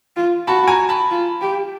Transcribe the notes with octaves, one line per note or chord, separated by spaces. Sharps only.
F4
F#4 A5 B5
G#5 A#5
A5 B5
F4
G4